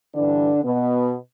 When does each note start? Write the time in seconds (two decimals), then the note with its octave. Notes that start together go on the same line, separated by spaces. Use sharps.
0.14 G2 D3 E3 D4
0.63 B2 B3